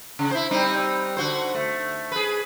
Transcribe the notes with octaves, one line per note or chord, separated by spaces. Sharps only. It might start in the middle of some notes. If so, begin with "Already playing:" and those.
C#3
E4 C5
G3 C4 D#4
D3 F#4 C5
A3
G#4 B4